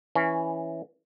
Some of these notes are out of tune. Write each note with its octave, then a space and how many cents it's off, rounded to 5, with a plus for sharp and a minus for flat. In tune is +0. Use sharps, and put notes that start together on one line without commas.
E3 +0 C#4 +5